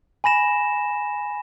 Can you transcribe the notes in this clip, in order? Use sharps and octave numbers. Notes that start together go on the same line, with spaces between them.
G#5 B5 A#6 E7